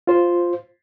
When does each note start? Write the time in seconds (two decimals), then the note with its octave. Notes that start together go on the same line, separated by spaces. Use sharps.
0.07 F4 C5